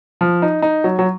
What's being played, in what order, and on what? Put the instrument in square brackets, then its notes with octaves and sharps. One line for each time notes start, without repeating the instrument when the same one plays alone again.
[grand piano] F3
D#4
D#4
F#3
F#3